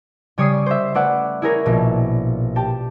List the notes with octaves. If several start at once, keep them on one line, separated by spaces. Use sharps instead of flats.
C#3 G3 C#5 D5 D#6 C7
C5 E5
A3 C#4 B4 D5 E5 F#5
E4 G#4 A#4 C#5
A#1 B2
G4 G5 A5